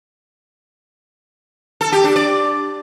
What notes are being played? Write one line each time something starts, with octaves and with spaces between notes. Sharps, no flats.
A4
G4
D4
D5